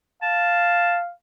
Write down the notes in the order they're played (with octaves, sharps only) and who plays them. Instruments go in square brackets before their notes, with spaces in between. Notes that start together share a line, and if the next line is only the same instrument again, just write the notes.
[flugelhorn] F5 [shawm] A5